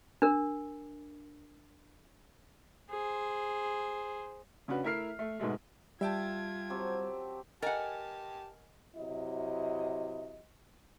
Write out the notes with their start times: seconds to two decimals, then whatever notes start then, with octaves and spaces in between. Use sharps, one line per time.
0.22 D4 A#4
2.90 G#4 C5
4.68 C#3 C#4 D4 F#4 B4
4.84 A3 E4 A#4 E5 F6 C7
5.19 A3
5.39 G#2 B2 G#3 A3
6.01 G3 F4 E5 G5 A5 G#6
6.70 F#3 C4 G4
7.62 G4 A#4 D#5 F#5 G#5 A5
8.96 C3 F#3 E4 D#5